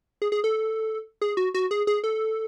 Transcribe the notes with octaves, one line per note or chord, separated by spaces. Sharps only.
G#4
G#4
A4
G#4
F#4
F#4
G#4
G#4
A4